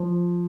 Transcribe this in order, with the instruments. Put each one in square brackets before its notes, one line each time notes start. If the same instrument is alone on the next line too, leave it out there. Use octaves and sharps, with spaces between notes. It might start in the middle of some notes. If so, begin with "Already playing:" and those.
Already playing: [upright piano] F3